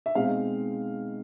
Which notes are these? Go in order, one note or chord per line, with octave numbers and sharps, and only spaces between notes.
E5
B2 G#3 C4 D#4 F5